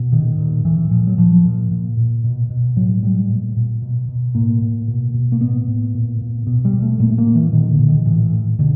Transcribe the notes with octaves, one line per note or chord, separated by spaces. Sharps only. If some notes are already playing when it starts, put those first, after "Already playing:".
Already playing: B2
A#2 D#3
A#2
A#2 E3
A#2 F3
F#3
A#2 F3
A#2
A#2
A#2
B2
B2
A2 F#3
A2 G3
A#2
A#2
B2
B2
A2 A#3
A2
B2
B2
A#3
A2 B3
A2
A#2
A#2
B2 B3
G3
B2
A3
A#2 A#3
A3
A#3
A#2
E3
A#2 D#3
D3
A#2
D#3
A2 E3
A2
B2 D3